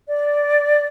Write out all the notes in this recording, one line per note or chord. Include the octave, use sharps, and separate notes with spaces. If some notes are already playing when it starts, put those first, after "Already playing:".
D5